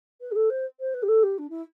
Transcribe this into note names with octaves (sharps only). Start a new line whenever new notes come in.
B4
G4
A4
C5
C5
B4
G4
A4
G4
D4
E4